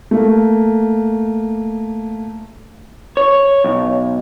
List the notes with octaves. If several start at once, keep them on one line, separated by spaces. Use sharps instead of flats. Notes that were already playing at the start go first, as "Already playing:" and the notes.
A3 A#3
C#5
B1